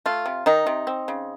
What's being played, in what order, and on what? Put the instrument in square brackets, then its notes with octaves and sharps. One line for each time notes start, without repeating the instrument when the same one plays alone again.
[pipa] A3 F4
C3
D#3 D#4
C3
C4
C#3